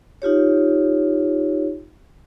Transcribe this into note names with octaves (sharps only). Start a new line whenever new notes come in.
D#4 F4 G4 C#5